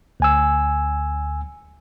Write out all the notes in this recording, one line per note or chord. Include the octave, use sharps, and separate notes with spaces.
D2 G#5 E6